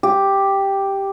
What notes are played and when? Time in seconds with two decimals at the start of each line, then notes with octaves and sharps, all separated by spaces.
0.03 G4